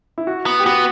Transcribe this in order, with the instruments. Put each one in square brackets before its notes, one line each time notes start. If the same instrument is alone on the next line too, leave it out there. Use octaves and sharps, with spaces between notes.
[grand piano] E4
F#4
[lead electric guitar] B3
[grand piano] G4
[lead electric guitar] B3 [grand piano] F#4